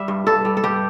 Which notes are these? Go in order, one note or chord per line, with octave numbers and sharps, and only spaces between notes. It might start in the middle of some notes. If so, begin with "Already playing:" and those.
Already playing: G3 E5
G2
G2 A4
G3
A4
G2 G4